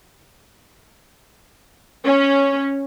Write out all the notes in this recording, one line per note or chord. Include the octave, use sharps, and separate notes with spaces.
C#4